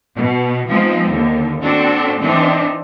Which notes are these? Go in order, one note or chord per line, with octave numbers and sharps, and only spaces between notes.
B2
F3 G#3 B3 C4 D#4
D#2 D3
C4 D4 F#4 A4
E3 C4 D4 D#4